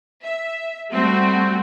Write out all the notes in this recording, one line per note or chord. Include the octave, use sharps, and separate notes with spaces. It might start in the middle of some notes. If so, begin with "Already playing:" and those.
E5
G3 A3 C4 F#4